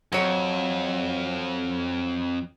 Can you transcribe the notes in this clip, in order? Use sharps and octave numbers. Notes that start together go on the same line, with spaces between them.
F2 F#3 C#5